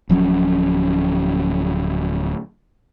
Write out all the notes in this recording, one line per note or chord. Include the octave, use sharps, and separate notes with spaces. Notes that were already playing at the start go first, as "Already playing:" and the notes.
D1 F3 F#3 C#4